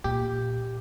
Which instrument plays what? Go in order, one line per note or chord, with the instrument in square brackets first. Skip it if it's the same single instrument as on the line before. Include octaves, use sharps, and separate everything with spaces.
[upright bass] A#2 [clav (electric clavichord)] G4